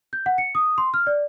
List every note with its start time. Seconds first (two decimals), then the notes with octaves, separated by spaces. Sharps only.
0.13 G6
0.26 F#5
0.38 C#7
0.55 D#6
0.78 C6
0.94 F6
1.07 D5